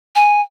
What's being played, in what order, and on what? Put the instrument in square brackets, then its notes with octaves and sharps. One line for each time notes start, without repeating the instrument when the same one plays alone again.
[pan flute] G#5